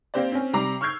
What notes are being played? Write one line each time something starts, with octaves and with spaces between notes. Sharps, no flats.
A#3 C4 G4 C5 D5
C4 C#4
C3 G3 A#5 D6 C7
C#6 E6 F6 G6 G#6 C7